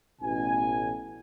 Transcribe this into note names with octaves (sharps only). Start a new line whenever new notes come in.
A1 B2 G#5